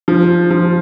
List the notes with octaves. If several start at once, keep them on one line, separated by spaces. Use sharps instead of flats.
F3
F3